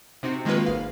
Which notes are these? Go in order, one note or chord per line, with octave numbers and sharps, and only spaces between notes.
C3 C4 D#4 F#4
D#3 G#3 A#3 D#4 F4 B4
G#1 F5